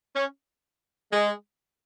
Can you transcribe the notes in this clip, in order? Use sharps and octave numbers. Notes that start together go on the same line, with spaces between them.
C#4
G#3